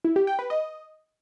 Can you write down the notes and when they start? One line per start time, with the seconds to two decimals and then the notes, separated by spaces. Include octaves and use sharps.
0.04 E4
0.16 G4
0.27 G5
0.39 B4
0.50 D#5